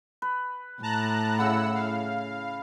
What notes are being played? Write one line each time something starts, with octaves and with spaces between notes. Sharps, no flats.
B4
A2 A5 A#5 F#6
C#3 E4 F#5 E6
F5